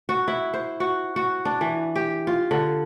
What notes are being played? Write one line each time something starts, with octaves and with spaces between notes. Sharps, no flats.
F#4
E4
C5
F#4
F#4
D4
E3
G4
F4
D3